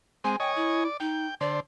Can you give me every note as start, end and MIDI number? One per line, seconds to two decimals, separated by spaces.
0.24 0.36 56
0.24 0.36 60
0.24 0.38 80
0.40 0.84 73
0.40 0.84 75
0.40 0.51 79
0.40 0.84 80
0.56 0.86 64
0.85 0.97 74
1.00 1.26 63
1.00 1.35 79
1.41 1.60 50
1.41 1.60 72
1.41 1.57 74